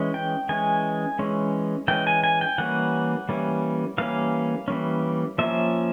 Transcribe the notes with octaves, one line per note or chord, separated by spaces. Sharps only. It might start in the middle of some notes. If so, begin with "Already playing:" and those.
Already playing: E3 G#3 C#4
G5
E3 G#3 C#4 G#5
E3 G#3 C#4
E3 G#3 C#4 G5
G#5
G#5
G5
E3 G3 A#3 C#4 F#5
E3 G3 A#3 C#4
E3 G3 A#3 C#4 F5
E3 G3 A#3 C#4
F3 A#3 C#4 E5